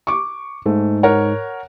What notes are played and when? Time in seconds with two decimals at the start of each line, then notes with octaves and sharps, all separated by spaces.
0.07 C#6 D6
0.66 G#2 A3
1.03 A#4 C#5 F#5